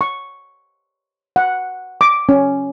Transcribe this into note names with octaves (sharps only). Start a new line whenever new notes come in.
C#6
F#5
D6
C#4